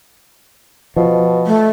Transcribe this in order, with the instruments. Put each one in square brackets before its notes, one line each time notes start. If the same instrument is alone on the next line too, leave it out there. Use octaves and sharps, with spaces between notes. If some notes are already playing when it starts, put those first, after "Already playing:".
[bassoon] B2 [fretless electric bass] F3
[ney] A3